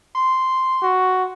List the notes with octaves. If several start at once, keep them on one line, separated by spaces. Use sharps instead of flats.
C6
F#4